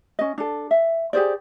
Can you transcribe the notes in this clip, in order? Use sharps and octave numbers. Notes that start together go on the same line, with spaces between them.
C#4 D#5
D4 A4
E5
G4 G#4 C5 D5